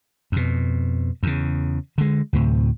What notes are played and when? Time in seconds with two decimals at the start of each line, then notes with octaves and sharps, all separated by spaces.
0.32 F2 B2
1.23 E2 C#3
1.98 D3 G#3
2.33 D2 A2 C3